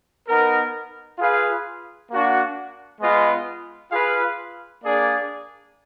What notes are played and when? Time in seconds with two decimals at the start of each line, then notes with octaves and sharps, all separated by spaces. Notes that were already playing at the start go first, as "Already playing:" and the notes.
0.28 B3 D#4 A#4
1.18 F4 G#4 B4 F5
2.10 A#3 D4 F#4
3.00 G#3 B3 F4 B4 D#5
3.91 F4 G#4 B4 F5
4.84 A#3 D4 G#4 D5